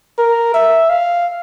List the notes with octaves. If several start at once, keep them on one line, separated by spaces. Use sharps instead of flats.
A#4
E5
F5